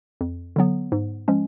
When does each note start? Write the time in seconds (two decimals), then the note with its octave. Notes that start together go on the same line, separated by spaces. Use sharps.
0.21 F2
0.56 D3 F#3 B3
0.92 G#2
1.28 F3 G#3 C#4